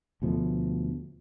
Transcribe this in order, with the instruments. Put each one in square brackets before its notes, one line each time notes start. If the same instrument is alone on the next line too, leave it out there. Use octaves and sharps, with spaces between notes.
[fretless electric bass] D2 B2 F3 A3